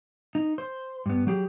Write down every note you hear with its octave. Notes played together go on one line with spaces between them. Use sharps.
D#4
C5
G2 B3
F#3 G4 G#4